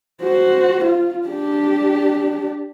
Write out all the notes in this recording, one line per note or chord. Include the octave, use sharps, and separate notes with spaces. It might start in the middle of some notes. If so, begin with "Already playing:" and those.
F#4 C5
F4
D4 G4